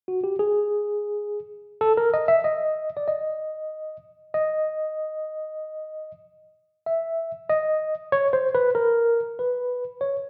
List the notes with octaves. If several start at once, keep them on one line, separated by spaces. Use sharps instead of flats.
F#4
G4
G#4
A4
A#4
D#5
E5
D#5
D5
D#5
D#5
E5
D#5
C#5
C5
B4
A#4
B4
C#5